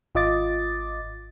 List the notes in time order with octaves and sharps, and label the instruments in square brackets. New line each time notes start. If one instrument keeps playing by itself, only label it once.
[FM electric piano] G#1 F4 D#5 D6 A6